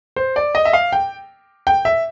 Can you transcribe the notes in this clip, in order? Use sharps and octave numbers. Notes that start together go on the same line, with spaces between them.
C5
D5
D#5
E5
F5
G5
G5
E5